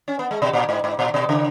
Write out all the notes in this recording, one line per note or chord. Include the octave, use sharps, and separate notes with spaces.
C#4
B3
G#3
B2
A#2
G#2
G#2
A#2
B2
C#3